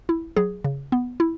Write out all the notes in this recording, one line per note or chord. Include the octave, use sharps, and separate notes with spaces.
E4
F#3 G#4
C#3
B3
E4